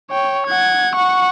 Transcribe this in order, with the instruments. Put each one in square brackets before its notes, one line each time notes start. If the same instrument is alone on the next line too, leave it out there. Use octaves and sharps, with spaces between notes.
[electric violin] C#5 G5
F#5 G#6
F#5 C#6